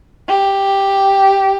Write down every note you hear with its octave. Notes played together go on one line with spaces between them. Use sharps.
G4